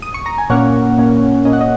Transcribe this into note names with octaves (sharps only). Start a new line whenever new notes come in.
D#6
C#6
A#5
G#5
A#2 A#3 C#4 C#5 F#5
A#2 A#3 C#4
A#2 A#3 C#4 D#5
F#5
D#5